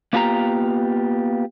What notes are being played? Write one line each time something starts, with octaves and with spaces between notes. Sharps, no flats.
A#3 B3 F4 G4 G#5 A#5